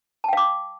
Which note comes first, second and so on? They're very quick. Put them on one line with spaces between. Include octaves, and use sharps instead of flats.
A5 G5 F5 D6